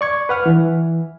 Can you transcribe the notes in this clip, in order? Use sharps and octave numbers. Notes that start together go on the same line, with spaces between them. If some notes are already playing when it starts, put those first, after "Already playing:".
D5 C#6 G#6
B4 F#5 F6
E3